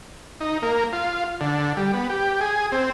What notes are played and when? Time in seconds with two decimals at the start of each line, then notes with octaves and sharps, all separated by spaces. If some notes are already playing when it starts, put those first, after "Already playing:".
0.41 D#4
0.62 A#3
0.93 F4
1.41 D3
1.77 G3
1.93 B3
2.10 G4
2.41 G#4
2.72 C4